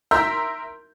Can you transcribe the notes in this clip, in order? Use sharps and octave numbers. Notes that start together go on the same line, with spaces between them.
A#4 E5 A#5 C6 E6 G6